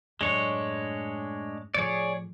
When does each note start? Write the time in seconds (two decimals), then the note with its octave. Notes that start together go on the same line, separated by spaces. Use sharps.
0.21 F#2 A2 G#3 D4 C#5
1.74 A2 F3 G#4 C#5 D5